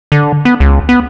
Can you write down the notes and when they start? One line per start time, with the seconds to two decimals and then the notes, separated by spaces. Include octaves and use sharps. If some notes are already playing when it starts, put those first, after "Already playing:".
0.12 D3
0.45 B3
0.60 C#2
0.89 B3